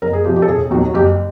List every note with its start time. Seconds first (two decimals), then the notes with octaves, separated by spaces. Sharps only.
0.02 F#1 A#4
0.13 G#4
0.24 F2 C3 F3 G4
0.36 G4
0.42 A4
0.48 E1 G#4
0.70 D#2 F#4
0.74 D#3 F#3
0.94 F#1 G4